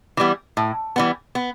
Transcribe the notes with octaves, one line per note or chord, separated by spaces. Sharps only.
E3 G3 B3
A2
E3 G3 B3
B3